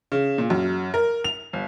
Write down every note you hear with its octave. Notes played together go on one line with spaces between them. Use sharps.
C#3
A#2
F#2
A#4
F7
G1